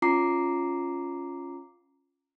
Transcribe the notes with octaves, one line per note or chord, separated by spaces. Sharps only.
C#4 F4 A#5 D6 C7